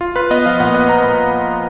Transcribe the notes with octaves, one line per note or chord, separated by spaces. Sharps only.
F4
F4 B4
B3 D#5
F3 F5
A#2 F#5
B3 D#5
B3 A#5
A#2 B5